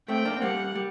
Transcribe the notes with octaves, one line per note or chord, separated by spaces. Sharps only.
A3 C4 G5
A#3 D4
C4
G3 A#3 F#5
G3